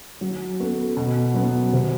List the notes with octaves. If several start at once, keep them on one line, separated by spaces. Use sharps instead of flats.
F#3
B3 F#4 A4
B2
F#3 B3
C3